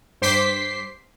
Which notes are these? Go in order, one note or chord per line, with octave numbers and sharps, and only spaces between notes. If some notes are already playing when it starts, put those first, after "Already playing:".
G2 C5 C6 D6 B6 C7